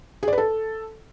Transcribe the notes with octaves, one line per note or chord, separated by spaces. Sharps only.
G#4
D5
B4
A4